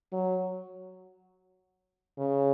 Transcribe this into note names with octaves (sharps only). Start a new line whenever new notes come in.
F#3
C#3